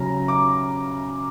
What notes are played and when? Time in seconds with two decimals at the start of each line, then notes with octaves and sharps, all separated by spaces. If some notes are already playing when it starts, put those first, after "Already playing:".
Already playing: C#3 F#3 C#4 A#5
0.28 D6